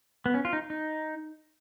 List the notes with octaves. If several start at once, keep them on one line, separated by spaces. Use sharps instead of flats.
B3
C#4
F4
D#4
D#4